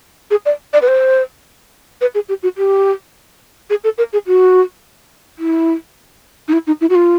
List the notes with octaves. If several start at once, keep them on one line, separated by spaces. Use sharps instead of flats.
G#4
D5
D5
B4
C5
B4
G#4
G4
F#4
G4
G#4
A4
A#4
G#4
F#4
E4
D#4
E4
D#4
E4
F#4
F4